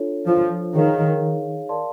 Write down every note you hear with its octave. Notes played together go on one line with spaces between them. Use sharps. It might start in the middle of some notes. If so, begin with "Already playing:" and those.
Already playing: D4 F4 A4 C#5
F3
D#3 G#4 C#5 F5
A#4 D5 F5 A5 C6